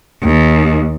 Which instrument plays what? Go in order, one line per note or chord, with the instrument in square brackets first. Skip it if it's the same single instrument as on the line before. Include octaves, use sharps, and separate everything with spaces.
[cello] D#2